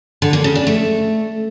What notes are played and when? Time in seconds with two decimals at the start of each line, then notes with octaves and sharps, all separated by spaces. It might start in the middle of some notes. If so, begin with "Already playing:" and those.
0.22 D3
0.33 A#3
0.44 C#3
0.55 D4
0.67 A3